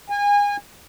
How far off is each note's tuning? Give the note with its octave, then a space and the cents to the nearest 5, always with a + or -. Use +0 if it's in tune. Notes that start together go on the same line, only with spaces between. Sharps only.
G#5 -30